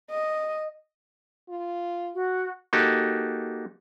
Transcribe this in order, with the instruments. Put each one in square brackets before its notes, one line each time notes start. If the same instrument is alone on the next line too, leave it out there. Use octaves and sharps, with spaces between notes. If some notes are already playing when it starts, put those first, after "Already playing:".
[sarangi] D#5
[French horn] F4
[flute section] F#4
[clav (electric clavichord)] A#3 D#4 F#4 G4 A4